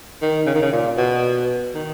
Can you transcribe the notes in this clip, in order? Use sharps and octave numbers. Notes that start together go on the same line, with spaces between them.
D#3
C#3
D#3
C#3
A#2
B2
D#3